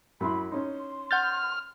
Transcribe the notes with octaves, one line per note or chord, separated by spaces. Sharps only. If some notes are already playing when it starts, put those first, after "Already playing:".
F#2 E4 B5 C6
C#4 D#4 C6
F#5 F6 G6 A6